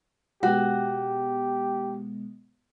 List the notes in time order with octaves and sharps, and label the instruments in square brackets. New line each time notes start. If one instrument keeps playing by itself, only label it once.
[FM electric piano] B2 G#3 B3 [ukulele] F#4 [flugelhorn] G4